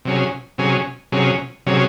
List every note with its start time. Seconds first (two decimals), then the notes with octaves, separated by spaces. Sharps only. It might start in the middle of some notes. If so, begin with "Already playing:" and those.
0.05 C3 F#3 C#4 G#4
0.58 C3 F#3 C#4 G#4
1.12 C3 F#3 C#4 G#4
1.66 C3 F#3 C#4 G#4